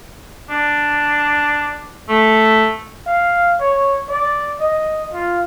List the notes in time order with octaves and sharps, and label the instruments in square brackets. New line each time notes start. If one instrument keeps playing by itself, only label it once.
[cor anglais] D4
A3
[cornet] F5
C#5
D5
D#5
F4